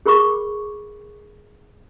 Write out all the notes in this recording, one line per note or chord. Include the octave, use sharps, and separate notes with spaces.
G#4 A#4 B5 C#6 D6